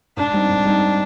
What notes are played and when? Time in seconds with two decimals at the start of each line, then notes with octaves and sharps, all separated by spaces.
0.17 G#2 D4
0.33 G3 C4 D#4
0.49 G#2
0.65 G3 C4 D#4